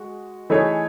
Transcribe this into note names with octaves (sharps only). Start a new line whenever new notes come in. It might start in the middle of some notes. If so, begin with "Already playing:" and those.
Already playing: G#3 F#4
E3 A3 D#4 G#4 C#5